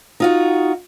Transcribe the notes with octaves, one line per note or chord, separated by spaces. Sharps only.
D#4 F4 F#4